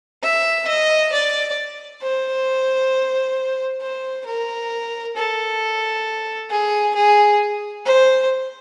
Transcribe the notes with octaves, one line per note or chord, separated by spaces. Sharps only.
E5
D#5
D5
C5
C5
A#4
A4
G#4
G#4
C5